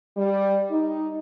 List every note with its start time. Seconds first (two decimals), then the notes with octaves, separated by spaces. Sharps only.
0.17 G3
0.70 D#4